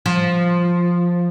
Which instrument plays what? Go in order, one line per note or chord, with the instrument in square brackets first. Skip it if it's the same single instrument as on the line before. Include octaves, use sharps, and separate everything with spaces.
[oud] F3